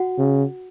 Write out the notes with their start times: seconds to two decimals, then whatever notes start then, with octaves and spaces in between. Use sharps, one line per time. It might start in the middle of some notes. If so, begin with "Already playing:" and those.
Already playing: F#4 F#5
0.18 C#3